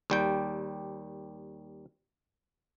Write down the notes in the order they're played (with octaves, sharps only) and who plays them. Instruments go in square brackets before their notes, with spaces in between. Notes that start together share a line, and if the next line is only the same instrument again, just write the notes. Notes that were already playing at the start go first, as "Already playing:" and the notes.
[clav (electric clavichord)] D#2 G3 G5